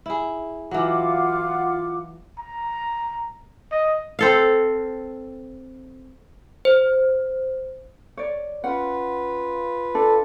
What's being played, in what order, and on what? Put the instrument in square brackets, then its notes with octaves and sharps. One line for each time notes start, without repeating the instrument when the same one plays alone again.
[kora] E4 G#4
[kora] E3 F#3 [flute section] F4 F#5 D6
[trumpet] A#5
D#5
[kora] C4 A4 F5
[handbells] C5
[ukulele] C#5 D5
[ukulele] C#4 F#5 [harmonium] F4 B4
[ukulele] D4 [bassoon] A4